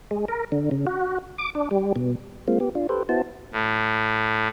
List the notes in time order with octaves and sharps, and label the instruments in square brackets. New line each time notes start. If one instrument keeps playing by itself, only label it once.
[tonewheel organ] G#3
A#4
D3
C#3
F#4
D6
D4
G3
B2
G#3 A#3 C4 F4
B3 G4
D4 F4
G4 A4 B4 C5
B3 E4 F#4 C5 A5
[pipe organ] A2